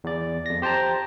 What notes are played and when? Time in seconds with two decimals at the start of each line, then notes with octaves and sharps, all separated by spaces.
0.04 E2 D5
0.46 F2 A#6
0.62 G4 C5 G5 A5 A#5